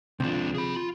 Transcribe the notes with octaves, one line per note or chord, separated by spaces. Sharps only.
C#2 C3 F3 D4
G#4 B5
F4